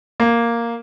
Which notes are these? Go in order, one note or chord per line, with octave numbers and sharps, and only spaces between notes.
A#3